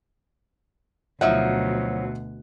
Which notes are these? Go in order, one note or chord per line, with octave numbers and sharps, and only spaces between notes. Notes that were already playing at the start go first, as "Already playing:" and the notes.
D2 B2 F3 F#3 D#4 E5 F#5